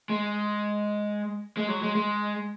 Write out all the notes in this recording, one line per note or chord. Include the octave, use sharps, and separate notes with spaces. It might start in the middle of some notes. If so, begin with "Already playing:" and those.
G#3
G#3
F#3
G#3
G#3